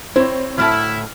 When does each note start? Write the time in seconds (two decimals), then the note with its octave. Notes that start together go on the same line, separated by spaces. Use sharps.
0.16 C4 E4 C5 C#5
0.58 D2 A2 E4 A5 F6